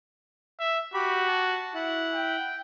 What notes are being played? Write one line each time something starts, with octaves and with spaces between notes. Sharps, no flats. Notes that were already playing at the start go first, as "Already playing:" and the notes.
E5
F#4 G4 B5
A5
E4 F#5
G5